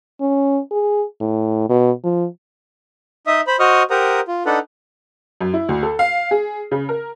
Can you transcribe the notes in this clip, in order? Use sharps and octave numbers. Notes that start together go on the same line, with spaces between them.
C#4
G#4
A2
B2
F3
D#4 D#5 E5 D#6
C5 B5
F#4 C5 D#5 C#6 D#6 F6
G4 A#4 C5 F#5 A#5 D#6
F4
D4 D#4 A4 B4 F#5
F#2
E4
D2
A4
F5
G#4
C#3
A#4